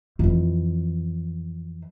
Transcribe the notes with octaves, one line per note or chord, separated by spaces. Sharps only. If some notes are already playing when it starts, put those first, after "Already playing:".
F2 E3